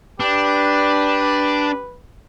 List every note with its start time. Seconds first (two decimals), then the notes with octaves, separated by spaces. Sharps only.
0.20 D4 G4 B4